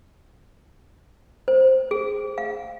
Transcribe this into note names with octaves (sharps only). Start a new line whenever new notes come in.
C5
G#4
F5